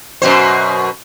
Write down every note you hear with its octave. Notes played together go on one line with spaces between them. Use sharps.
F#2 B2 C5